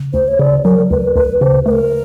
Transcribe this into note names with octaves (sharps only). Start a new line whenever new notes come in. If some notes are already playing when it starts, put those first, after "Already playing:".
Already playing: C#3
D2 C5
C#5
C#3 D5
F#3 A#4
D2 B4
D2 B4
C#3 C5
A3 B4
A#4